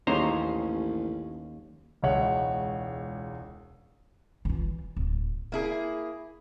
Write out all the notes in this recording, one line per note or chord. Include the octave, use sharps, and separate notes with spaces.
A1 D#2 C#4 G#4 C5 A#5
E1 C#2 C#5 F#5
E3 F4
D1
A#3 E4 G#4